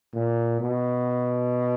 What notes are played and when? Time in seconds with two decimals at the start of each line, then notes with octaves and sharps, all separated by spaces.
0.14 A#2
0.60 B2